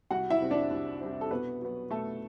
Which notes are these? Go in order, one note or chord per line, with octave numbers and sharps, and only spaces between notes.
C2 F#4 F#5
E4 E5
C3 G3 C4
D4 D5
C2
C3 G3 C4
A4
B2 B3 B4
F#3 B3
B2 A3 A4